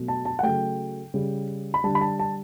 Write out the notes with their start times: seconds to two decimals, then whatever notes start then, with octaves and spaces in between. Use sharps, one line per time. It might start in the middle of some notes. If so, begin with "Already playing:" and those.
Already playing: B2 F#3 A3
0.08 A5
0.25 A5
0.39 F#5
0.43 C#3 F#3 A3 G5
1.14 C#3 G3
1.74 B5
1.84 D3 G3 A5
1.95 B5
2.01 A5
2.19 A5